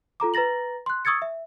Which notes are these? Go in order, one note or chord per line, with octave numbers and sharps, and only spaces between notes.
F4 A4 A#5 D6
B4 A#5 A6 A#6 F#7
C6 F#6
C#6 D#6 E6 G#6 A6 C#7
E5